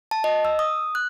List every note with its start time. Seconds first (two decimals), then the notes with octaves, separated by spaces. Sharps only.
0.11 A5
0.24 D#5
0.45 E6
0.59 D#6
0.95 F#6